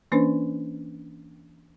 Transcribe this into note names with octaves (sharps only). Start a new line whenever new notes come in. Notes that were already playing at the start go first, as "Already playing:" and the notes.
E3 A#3 C#4 D4 B4 C5